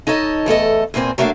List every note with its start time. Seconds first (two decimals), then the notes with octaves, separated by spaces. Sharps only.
0.07 D#4 A4 C#5 D#5
0.46 E2 A3 A4 D#5
0.94 E2 A#2 A#3 C4 G#5
1.18 F#3 A3 A#3 D4 E5 F5